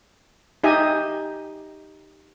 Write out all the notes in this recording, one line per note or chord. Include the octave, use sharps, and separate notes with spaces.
D#4 G4 D#5 E5 G#5